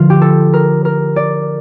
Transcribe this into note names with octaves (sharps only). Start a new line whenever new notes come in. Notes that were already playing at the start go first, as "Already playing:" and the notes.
Already playing: D3 F3 A3 F4
G4
A4
A#4
A#4
D5